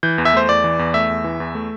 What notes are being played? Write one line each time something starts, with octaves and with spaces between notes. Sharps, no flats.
E3 G6
E2
E5
A3 C5
E2 D5
E3
E2
A3 E5
E2
E3
E2
A3